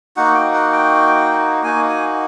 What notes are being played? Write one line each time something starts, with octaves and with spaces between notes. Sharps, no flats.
A#3 D#4 F#4 F#5
G5
F#5
G5
A#3 D#4 F#4 G#5
G#5